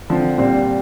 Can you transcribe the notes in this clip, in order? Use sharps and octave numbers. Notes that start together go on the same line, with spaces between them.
D3 F3 C4
A#2 G3 C4